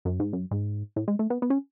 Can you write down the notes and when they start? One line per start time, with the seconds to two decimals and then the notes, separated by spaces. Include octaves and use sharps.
0.05 F#2
0.20 G#2
0.33 F#2
0.51 G#2
0.96 A2
1.08 G#3
1.19 A3
1.30 B3
1.42 B3
1.50 C#4